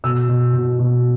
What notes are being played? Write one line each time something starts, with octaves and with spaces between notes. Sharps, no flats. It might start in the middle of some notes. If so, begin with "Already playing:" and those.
B2 E6
B2
B2
B2